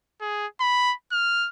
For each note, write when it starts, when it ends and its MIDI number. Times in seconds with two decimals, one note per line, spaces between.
0.21 0.47 68
0.61 0.94 83
1.12 1.49 89